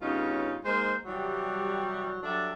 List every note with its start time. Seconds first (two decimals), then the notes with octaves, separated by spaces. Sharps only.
0.01 G2 C#3 B3 C#4 D#4 F4
0.64 G#3 A#3 D#4 C5
1.05 C3 E3 F#3 G3
2.23 F#3 G3 D4 A4 D5 E5